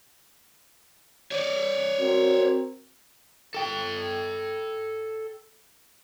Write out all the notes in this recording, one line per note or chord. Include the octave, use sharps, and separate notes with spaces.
C#5 D5
C4 F#4 A#4
A4 G5